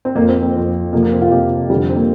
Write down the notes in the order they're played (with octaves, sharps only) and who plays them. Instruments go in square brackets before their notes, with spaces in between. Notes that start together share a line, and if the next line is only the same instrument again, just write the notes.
[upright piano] C4
F2 A#3
F3
C4
C4
F2 F3
F2 C3 F3 A#3
A#3
C4
F4
F2 C3 F3 G4
F2 D3 F3 G3
C4
A#3